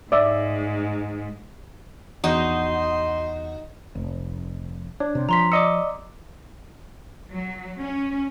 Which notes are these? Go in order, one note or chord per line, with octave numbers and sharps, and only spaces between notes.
G#2 D5 E5
E2 D#4 F#4 C5 D#5 C6 G6
F1
D4 C#5
C3
F3 A#5 C6 B6
D5 D#5 D6 E6 C#7
F#3
C#4